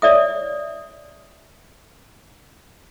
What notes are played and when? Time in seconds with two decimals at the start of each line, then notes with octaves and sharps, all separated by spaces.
0.02 C#5 D5 E5 D#6